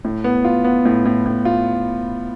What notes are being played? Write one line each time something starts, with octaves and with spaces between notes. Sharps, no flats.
A2
B3
F4
B3
A2
A2
A2
F4